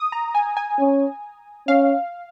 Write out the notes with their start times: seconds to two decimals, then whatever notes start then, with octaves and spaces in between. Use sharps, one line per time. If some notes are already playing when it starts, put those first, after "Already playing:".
Already playing: D#6
0.12 A#5
0.35 G#5
0.57 G#5
0.79 C#4
1.67 C#4 F5